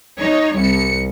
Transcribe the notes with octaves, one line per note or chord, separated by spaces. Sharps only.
D#4 C#5
C2 C#7